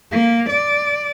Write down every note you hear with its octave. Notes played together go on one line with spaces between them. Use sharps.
A#3
D5